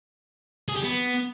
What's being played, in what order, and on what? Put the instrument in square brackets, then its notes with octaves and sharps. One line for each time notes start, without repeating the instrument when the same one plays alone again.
[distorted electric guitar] G#4
G4
B3